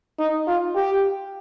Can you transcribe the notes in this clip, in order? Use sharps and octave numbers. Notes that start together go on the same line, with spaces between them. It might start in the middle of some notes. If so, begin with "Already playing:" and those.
D#4
F4
G4